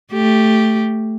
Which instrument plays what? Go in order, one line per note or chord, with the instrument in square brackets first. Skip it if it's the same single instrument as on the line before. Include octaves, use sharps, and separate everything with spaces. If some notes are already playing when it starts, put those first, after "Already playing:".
[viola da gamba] A3 G4